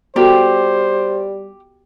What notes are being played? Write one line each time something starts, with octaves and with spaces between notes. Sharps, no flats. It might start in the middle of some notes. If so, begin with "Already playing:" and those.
G3 B3 F#4 G4 A4 C5